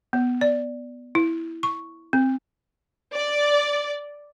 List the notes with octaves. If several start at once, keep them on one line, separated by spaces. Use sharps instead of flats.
B3
D5
E4
C#6
C4
D5